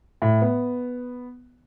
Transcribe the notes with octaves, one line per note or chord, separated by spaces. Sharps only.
A2
B3